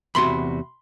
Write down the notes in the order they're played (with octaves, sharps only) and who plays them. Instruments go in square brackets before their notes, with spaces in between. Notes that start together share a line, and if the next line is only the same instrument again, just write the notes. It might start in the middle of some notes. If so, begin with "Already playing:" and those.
[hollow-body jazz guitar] E2 C3 F#4 [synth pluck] B5 C6